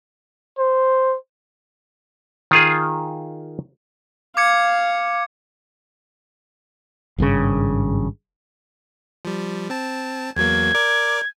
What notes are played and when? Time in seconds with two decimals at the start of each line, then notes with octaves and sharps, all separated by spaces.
0.59 C5
2.51 D#3 F4 G#4
4.37 F5 D6 G#6 C#7
7.18 G#1 G2 A#2 C#3
9.25 F3 G3
9.70 C4 A5
10.36 E2 F#3 A#3 G#6
10.75 A#4 D5 D6